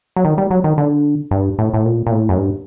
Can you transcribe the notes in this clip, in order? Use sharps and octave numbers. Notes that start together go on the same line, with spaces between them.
F#3
D#3
G3
F#3
D#3
D3
G2
A2
A2
A#2
A#2
A2
F#2
G2